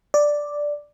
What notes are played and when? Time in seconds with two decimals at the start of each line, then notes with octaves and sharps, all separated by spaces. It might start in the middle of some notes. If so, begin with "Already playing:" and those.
0.14 D5